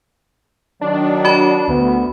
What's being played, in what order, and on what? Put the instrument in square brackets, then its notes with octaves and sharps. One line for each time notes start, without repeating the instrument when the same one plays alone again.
[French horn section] D#3 F#3 [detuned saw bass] D4
[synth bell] F#4 B5
[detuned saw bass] D2 [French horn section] B3